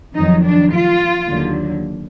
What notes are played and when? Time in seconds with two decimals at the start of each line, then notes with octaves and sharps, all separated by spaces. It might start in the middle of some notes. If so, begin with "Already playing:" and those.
0.15 F2 D#3 F#3 D#4
0.44 D4
0.72 F4
1.30 D#2 D3 F#3